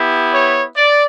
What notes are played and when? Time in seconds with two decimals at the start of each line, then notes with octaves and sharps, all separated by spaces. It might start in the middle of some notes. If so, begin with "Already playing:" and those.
Already playing: B3 E4 G4
0.34 C#5
0.76 D5